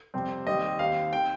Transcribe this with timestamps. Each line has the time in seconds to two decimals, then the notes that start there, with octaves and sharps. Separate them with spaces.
0.14 F2 C3 G3 C4
0.47 D#2 D#3 G3 C4 D#5
0.79 D#2 D#3 C4 F5
1.13 D#3 C4 G5